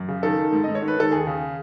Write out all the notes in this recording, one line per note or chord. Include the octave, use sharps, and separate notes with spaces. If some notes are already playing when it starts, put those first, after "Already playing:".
Already playing: F#2
C#3
D#3 A4
D#3
G#2
G#2 D#5
C#5
D#3
B4
D#3 A4
D#2 G#4
C#3